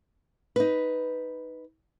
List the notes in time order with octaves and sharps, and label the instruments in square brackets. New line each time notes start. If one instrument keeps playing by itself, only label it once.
[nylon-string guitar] D#4 B4